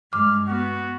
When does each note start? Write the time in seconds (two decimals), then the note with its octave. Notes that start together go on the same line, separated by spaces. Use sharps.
0.13 G2 G#3 D6 F6
0.48 B3 F#4